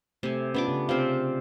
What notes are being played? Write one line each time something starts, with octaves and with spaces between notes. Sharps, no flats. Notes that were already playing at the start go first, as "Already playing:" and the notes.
C3 A3 G#5
B3 C#4 D4 F4 D6
C#3 G4
C3 C4 F4 D5 F5